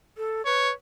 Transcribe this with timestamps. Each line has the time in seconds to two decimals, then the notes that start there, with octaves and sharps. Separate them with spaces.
0.17 A4
0.46 B4 C#5